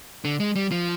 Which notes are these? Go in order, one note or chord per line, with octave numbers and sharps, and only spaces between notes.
D3
G#3
G3
F3